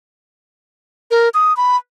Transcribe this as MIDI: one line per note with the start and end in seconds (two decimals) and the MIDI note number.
1.11 1.29 70
1.34 1.56 87
1.57 1.77 83